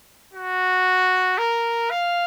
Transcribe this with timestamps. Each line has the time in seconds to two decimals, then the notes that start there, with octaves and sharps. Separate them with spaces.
0.34 F#4
1.38 A#4
1.91 F5